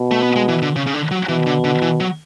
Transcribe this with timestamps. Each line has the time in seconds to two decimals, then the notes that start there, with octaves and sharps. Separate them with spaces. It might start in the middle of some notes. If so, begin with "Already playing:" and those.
Already playing: B2
0.11 A3
0.23 B3
0.36 G#3
0.49 E3
0.62 D3
0.76 C#3
0.86 C#3
0.94 D3
1.11 F#3
1.29 B2 E3
1.47 D3
1.64 D3
1.82 E3
2.00 F#3